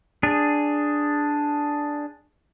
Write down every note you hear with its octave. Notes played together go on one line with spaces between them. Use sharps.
D4 G#4